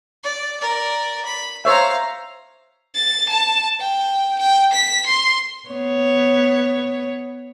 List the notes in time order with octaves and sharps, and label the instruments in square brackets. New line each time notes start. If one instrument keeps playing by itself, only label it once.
[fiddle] D5
A#4 D5
B5
[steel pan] C5 C#5 E5 [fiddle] F5 A#5
[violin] A6
A5
G5
G5
B6
C6
[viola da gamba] B3 C#5